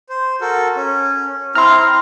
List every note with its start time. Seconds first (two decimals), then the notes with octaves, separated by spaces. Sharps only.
0.09 C5
0.41 F#4 A4 A#4
0.76 C#4
1.55 C4 E4 A#5 C6 F6